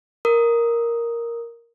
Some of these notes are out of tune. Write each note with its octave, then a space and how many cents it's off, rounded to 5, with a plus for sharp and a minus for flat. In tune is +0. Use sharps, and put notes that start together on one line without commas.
A#4 +0 D#6 +0